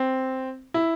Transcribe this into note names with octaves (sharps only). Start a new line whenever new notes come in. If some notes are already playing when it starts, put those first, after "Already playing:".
Already playing: C4
E4